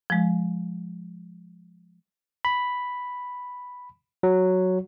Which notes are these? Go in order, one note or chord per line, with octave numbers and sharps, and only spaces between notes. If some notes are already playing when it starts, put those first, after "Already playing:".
F3 G#3
B5
F#3